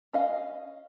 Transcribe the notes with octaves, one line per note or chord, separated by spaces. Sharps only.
C#4 D#5 F5